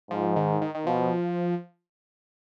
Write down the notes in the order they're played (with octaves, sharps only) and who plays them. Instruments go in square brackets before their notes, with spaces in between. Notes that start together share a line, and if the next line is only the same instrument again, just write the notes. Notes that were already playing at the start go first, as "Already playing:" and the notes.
[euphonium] G#2 [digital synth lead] F3
[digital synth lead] D#3
D#3
D#3
[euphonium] B2 [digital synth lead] F3